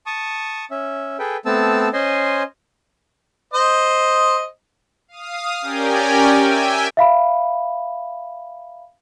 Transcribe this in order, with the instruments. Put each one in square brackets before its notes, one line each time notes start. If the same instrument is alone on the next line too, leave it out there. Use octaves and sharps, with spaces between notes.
[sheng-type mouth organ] A5 C#6 D#6
C#4 E5
G#4 A4 B4 G5
A3 B3 C4 A5 E6
C#4 C5 D#5 G#5 C6
[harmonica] C5 D#5
[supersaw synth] F5 D#6
C#4 G4 A#4 D5 G5 G#5
E5 G5 G#5
[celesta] E5 F5 B5